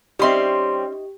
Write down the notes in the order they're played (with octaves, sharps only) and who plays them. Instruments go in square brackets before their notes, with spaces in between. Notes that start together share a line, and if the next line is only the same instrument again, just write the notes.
[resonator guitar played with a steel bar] G3 C4 [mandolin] C#4 C6 [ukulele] D#4 D#5 E5 [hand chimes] G4